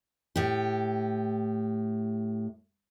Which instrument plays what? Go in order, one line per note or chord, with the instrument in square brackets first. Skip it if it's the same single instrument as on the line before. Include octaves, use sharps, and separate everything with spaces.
[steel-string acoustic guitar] A2 G4